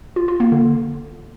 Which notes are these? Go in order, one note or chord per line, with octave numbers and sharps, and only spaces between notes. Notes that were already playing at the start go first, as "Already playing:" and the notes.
F4
F4
A#3
D3